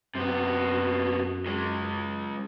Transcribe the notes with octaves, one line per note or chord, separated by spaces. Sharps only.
F#2 C3 B3
C#3 G#3